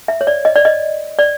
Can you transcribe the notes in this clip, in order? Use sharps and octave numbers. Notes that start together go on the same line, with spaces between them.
E5
C#5
D5
D#5
D5
D#5
D5